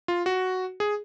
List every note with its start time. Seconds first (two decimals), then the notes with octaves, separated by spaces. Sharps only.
0.08 F4
0.26 F#4
0.80 G#4